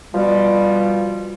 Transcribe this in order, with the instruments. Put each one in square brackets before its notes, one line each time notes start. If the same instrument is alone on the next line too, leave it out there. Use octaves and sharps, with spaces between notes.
[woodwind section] B2 F3 G3